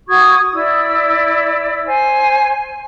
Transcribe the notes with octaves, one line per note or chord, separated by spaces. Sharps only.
F#4 C#6 D#6 G#6
E4 D5 E6
C5 G#5